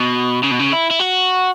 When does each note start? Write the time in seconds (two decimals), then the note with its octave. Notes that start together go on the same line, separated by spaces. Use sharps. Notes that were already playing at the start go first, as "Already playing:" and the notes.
Already playing: B2
0.43 C#3
0.51 B2
0.59 C#3
0.72 E4
0.90 E4
0.99 F#4